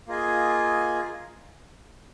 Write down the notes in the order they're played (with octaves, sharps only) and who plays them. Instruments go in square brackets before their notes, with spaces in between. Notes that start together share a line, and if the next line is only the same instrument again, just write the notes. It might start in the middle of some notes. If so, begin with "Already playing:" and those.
[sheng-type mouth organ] A#3 F4 G#4 D#5 G#5